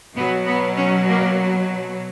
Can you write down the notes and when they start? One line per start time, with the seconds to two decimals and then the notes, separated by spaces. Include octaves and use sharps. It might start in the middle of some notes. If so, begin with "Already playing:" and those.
0.15 B2 F#3 B3
0.46 B3
0.77 C#4
1.09 A#3